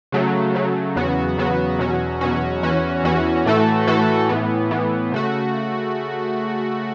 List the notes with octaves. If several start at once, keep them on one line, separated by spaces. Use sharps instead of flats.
C#3 F#3 A3
C#3 F#3 A3
E2 C#3 F#3 B3 F#4
E2 C#3 F#3 B3 F#4
E2 B2 F#3 C#4 F#4
E2 B2 F#3 C#4 F#4
E2 E3 C#4 F#4
E2 E3 C#4 F#4
A2 E3 A3 F#4 A4
A2 E3 A3 F#4 A4
A2 E3 B3
A2 E3 B3
C#3 A3 F#4